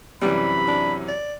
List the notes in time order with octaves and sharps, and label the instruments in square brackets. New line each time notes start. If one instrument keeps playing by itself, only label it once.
[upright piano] F#2 C3 E3 [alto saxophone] G3 [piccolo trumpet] B5
[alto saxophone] D4
D5